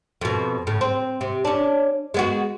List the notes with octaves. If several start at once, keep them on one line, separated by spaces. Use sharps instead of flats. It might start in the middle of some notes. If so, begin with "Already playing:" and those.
F2 B2
A2 C#3
C4
C3
C#4 D4
G#3 B3 F#4